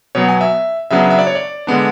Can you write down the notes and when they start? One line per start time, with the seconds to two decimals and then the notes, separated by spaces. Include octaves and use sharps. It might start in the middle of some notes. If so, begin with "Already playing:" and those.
0.15 B2 F#3 B3 C#5
0.29 G#5
0.41 E5
0.91 C#3 F#3 B3 D4 E5
1.11 E5
1.19 D5
1.27 C#5
1.35 D5
1.67 D3 G#3 B3 D4